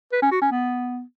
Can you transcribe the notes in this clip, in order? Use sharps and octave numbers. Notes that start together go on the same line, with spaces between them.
B4
C#4
F#4
C#4
B3